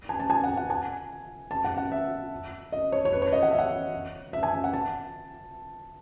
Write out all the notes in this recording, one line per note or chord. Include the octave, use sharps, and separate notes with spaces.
G#5
A5
G#5
F#5
F#5
G#5
A5
F#5
F#5
E5
D#5
C#5
C#5
B4
C#5
D#5
F#5
E5
F#5
E5
G#5
E5
F#5
A5